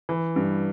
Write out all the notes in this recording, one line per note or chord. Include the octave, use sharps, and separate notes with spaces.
E3
G2